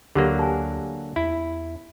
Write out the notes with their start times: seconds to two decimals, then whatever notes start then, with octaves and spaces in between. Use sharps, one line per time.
0.15 D2 D3 F#3 A#3 G4 F#5
0.39 G#5 A5
0.53 F#5
1.16 E2 E4